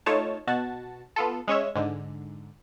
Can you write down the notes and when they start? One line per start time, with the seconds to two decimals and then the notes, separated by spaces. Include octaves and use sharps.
0.06 A3 D#4 F4 C#5 A5
0.47 B2 F#4 A5
1.16 B3 F4 A4
1.48 G#3 C#4 C#5 E5
1.75 G#2 D3